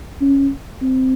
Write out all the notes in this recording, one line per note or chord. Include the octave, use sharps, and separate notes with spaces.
C#4
C4